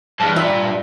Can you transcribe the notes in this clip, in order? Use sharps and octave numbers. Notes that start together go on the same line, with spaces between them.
G2 E3 G#4 A5
F4 D5 E5